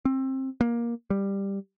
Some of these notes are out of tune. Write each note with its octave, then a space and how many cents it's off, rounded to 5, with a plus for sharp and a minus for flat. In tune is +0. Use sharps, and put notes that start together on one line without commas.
C4 +25
A#3 +15
G3 +10